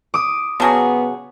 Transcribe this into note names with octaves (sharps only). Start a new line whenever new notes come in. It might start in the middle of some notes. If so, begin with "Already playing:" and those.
D6 D#6
C#3 F#3 B3 G#4 G#5 A5